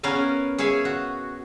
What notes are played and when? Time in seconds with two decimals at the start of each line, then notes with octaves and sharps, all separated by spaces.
0.03 B3 C#4 A#4 F5 G#5
0.58 G#4 C#5 E5 F5 G#5
0.85 F#4